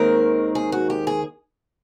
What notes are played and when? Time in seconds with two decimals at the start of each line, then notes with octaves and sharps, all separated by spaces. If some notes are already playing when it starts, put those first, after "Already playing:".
Already playing: D#2 D#3 G#3 C4 A#4
0.55 G#4
0.72 F#4
0.90 G4
1.07 G#4